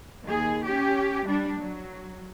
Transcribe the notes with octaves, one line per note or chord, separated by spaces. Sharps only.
D#2 G#4
C#4 G4
G3 D4
F#3